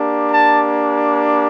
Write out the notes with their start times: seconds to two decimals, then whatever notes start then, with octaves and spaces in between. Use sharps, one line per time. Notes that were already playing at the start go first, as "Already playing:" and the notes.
Already playing: A#3 D4 G4
0.30 A5